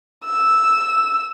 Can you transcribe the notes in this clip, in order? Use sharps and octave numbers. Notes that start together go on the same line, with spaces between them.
E6